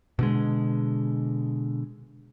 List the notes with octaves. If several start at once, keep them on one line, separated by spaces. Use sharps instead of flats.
B2 D3 G#3